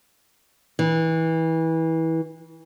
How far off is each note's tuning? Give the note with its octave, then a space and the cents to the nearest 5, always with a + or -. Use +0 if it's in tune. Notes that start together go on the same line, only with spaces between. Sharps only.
E3 -25